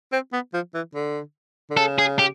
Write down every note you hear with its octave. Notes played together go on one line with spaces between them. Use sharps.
C4
B3
F3
E3
D3
D3
C#3 A4
G#4
G4